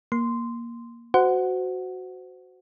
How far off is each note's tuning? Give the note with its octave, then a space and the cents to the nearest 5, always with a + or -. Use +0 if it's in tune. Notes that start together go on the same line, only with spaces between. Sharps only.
A#3 +10 C6 -10
F#4 +0 C5 -25 F#5 +0